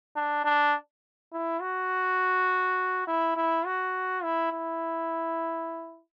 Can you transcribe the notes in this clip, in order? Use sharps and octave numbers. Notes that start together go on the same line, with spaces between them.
D4
D4
E4
F#4
E4
E4
F#4
E4
E4